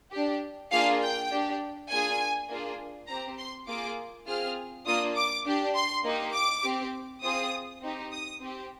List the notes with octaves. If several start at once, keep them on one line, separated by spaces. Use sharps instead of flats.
D4 G4
A#3 D4 F4 G#4 F5
G5
D4 G4
A#3 D4 F4 G#4 G#5
A#3 D4 F4 G#4
C4 G4 A#5
C6
A#3 F4 G#4 D6
C4 F4 G#4 F6
A#3 D4 F4 D#6
D6
D4 G4
C6
A#3 D#4 G4
D6
C4 G4
C4 F4 G#4 D#6
C4 D#4 G4
D#6
C4 G4